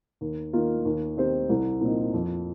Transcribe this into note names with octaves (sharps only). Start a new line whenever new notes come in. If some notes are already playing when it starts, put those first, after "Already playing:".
D#2
D#3 A#3 F4
D#2
D#3 C4 G4 C5
C2
A#2 F3 C4 D#4
F2